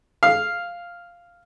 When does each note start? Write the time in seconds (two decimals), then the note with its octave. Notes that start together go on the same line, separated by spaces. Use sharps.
0.23 F5